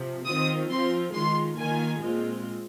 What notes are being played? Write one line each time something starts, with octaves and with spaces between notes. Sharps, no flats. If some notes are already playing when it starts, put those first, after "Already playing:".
Already playing: C3 F3
D#3 C4 F4 D#6
F3 C4 F4 C6
D#3 G#3 F4 C6
D#3 A#3 F4 G#5
A#2 G#3 C4 F4